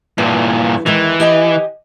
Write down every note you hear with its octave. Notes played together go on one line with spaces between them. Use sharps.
G2 A#2 E3
E2 D#3 E3 G#3
G4 D#5 G#5